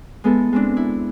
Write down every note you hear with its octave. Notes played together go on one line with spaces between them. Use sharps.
G#3 B3 E4 A4
G#3 C4 D4
E4